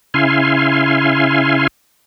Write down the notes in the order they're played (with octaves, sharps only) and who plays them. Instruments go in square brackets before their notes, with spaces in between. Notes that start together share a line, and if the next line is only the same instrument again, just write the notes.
[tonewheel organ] C#3 E4 F5 G#5 C6